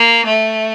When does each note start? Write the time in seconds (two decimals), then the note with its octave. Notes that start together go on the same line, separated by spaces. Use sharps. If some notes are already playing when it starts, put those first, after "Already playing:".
Already playing: A#3
0.27 A3